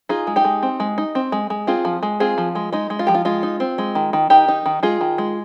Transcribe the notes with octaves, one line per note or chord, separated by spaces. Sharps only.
D#4 F4 G#4
G#3
D#4 G4
G#3
C4
G#3
D#4
C4
G#3
G#3
C4 F4 G#4
F3
G#3
C4 F4 G#4
F3
G#3
G#3 D#4
G#3
F4
F3 G4
F4
G#3 F4
D#4
C4
G#3
D#3
D#3
D#3 D#4 G4
D#4
D#3
G#3 F4 G#4
D#3
G#3